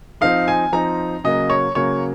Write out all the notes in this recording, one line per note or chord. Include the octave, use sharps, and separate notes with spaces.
F3 C4 D#4 F5
G#5
F3 C4 D#4 A#5
C#3 F#3 A#3 D#5
C#5
C#3 F#3 A#3 C#5